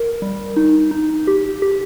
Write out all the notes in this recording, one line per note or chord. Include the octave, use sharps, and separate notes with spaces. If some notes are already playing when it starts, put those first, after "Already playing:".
Already playing: A#4
G3
D#4
D#4
G4
G4